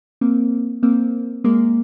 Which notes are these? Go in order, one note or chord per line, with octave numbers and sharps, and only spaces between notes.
A#3 C4
A#3 C4
G#3 A#3